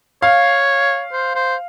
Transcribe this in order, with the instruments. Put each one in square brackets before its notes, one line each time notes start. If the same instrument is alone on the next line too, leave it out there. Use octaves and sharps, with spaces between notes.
[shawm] C#5 [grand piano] F5
[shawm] C5
C5